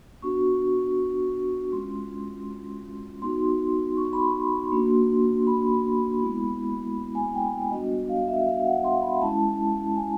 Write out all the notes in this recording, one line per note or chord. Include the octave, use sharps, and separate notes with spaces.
B3 D4 F#4 C#6
G#3 C#4 F4 C6
B3 D#4 F#4 C6
C#6
C6
B5
C6
A#3 D4 F#4
B5
G#3 B3 E4
G#5
G5
G3 B3 D4 F#4 D#5
F5
E5
F5
F#5
C6
B5
G#3 C#4 E4 A5
G#5